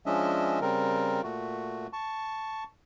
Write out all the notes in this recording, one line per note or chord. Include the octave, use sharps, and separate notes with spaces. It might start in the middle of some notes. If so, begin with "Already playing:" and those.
F3 G#3 C#4 D4 D#5 E5
C#3 G3 C4 A#4
A#2 A3 F#4
A5 C#6